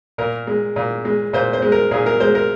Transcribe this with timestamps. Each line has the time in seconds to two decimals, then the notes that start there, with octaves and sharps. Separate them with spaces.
0.18 A#2 A#4
0.47 G#3
0.76 A#2
1.05 G#3
1.33 A#2 C5
1.53 C5
1.62 G#3
1.72 A#4
1.91 A#2 G#4
2.06 A#4
2.20 G#3 C5
2.35 A#4